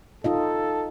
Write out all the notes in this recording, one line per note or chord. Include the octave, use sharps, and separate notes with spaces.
D#4 F4 A4 D#5